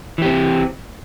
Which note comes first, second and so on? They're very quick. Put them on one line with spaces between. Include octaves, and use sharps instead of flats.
E3 G4 C4